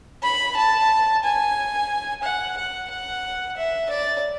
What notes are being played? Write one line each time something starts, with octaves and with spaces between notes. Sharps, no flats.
B5
A5
G#5
F#5
F#5
F#5
E5
D5